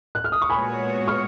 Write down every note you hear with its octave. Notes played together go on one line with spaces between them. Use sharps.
F#6
F6
D#6
C#6
A#2 G#3 B3 F#4 C#5 G#5 B5
C#6 F6